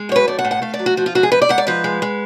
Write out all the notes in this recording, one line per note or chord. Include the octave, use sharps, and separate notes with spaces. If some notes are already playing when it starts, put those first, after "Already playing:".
Already playing: G#3
F#2 C#5
B4
A3 D5
F#5
A2
F#5
A3 F5
D5
F#3
F#4
F3 F#4
F4
G#2 F#4
G#4
G#2 B4
D5
G#2 F#5
D5
F3 B4
G#3
G#3